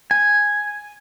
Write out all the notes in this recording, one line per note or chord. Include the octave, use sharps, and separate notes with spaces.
G#5